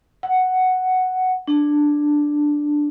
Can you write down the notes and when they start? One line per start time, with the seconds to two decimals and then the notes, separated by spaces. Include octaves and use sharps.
0.23 F#5
1.48 D4